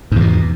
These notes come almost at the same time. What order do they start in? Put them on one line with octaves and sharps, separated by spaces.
G#2 E2 B2